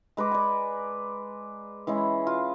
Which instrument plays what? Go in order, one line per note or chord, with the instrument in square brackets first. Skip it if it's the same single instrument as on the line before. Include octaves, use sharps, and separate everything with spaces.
[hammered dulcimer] G#3 B4 A#5 D6
D5 G#5
E3 G#3 C#4 E4
F4